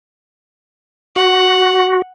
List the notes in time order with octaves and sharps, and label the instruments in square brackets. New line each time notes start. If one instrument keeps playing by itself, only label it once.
[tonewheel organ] F#4 [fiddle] F#5